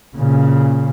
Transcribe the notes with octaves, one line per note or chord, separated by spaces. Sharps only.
A#2 C#3